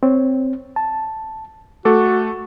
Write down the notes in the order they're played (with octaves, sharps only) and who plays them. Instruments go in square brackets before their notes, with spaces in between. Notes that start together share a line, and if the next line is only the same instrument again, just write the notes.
[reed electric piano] C4 C#5
A5
[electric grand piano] A3 A4 [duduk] F#4 [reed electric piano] D6